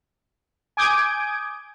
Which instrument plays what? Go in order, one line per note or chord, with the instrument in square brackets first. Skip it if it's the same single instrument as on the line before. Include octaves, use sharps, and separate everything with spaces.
[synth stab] G#5 D6 D#6 G6 G#6 D7